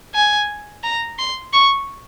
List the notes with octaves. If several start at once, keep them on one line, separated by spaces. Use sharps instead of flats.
G#5
A#5
C6
C#6